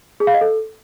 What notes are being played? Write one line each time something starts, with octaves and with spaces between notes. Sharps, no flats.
G#4
F5
D#5
A4